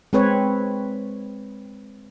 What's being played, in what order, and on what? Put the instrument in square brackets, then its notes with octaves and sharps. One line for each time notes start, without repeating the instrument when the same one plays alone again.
[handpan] G#3 C4 B4 C#5